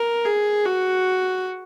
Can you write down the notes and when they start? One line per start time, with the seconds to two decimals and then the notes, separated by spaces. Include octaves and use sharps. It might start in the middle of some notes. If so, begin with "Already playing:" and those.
Already playing: A#4
0.25 G#4
0.65 F#4